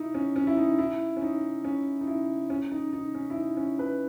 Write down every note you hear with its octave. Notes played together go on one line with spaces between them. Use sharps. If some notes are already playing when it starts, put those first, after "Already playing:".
Already playing: D#4 E4
C#4
C#4
E4
D#4
E4
C#4
D#4
C#4
D#4
E4
C#4
D#4
D#4
C#4
E4
D#4
C#4
B4